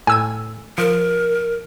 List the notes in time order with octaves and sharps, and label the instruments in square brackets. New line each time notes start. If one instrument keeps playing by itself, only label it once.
[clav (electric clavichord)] A2 [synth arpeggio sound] G#5 E6 G#6
[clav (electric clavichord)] F3 [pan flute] A#4